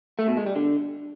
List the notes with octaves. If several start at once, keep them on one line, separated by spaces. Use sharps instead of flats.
A3
B2
G#3
G3
D3